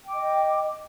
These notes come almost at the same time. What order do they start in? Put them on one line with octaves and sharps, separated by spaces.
G5 D6 D#5